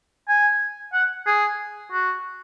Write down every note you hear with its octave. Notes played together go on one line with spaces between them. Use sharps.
G#5
F#5
G#4
F#4